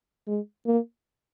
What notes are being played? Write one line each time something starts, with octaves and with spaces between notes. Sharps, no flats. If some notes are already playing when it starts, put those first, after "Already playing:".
G#3
A#3